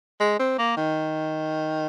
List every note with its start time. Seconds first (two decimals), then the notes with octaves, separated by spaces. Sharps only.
0.20 G#3
0.40 C4
0.59 A#3
0.77 D#3